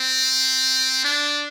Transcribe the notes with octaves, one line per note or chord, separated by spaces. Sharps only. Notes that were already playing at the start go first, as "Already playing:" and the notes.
Already playing: C4
D4